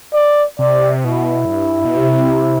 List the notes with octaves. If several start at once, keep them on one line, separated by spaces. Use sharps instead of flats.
D5
C3 D5
B2 E4
F#2
G2
B2
C3